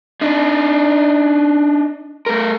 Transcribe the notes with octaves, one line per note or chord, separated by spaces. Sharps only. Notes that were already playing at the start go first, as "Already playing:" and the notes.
D4 D#4
A3 A#4